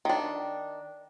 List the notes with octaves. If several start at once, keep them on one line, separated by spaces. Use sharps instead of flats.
D#3 D4